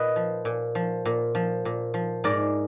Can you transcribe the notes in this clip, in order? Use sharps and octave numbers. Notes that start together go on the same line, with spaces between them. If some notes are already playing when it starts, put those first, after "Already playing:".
Already playing: A#2 B4 D#5
F3
A#2
F3
A#2
F3
A#2
F3
G#2 A#4 D5